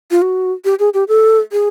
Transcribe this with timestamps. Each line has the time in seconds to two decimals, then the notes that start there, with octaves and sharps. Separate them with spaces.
0.11 F4
0.22 F#4
0.65 G4
0.79 G#4
0.94 G4
1.08 A4
1.52 G#4